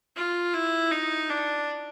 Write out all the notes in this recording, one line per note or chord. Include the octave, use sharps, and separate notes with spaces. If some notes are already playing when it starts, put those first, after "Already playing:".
F4
E4
D#4
D4